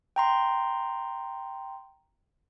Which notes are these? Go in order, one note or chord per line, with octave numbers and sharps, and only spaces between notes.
G5 A#5 C6